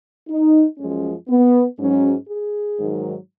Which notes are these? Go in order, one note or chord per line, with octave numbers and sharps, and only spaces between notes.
D#4
F#2 F3 G#3 C#4
B3
G#2 F#3 C#4
G#4
G#2 D#3 F#3